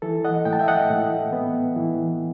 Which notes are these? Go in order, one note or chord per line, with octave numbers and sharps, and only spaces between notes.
E3 A4
D#5 F#5
A2 G5
A5
E5 G5
D#5 F#5
A2
B3
E3